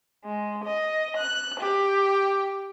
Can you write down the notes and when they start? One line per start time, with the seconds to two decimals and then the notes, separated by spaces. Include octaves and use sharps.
0.25 G#3
0.64 D#5
1.16 F#6
1.59 G4